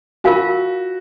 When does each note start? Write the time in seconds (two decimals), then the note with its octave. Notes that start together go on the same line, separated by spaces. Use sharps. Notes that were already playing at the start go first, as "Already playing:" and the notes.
0.24 F4 F#4 A#4 F5 G#5